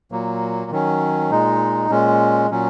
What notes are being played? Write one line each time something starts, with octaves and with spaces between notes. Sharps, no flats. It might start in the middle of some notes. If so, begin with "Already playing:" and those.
A#2 F#3 A#3
D#3 F#3 C#4
A#2 G#3 D#4
A#2 G#3 C#4
A#2 F#3 C#4